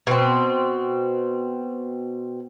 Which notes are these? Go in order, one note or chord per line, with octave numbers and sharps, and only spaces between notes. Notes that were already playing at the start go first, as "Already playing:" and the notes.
B2 C4